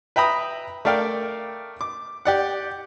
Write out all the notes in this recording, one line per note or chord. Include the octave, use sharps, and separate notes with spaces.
B4 E5 G5 A#5 B5 D#6
A3 A#4 D5 F5 G5
D6
G4 D5 F#5